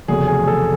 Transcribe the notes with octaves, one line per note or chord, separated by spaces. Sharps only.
F1 E2 C#3 F#3 A3 G#4
G#4
A4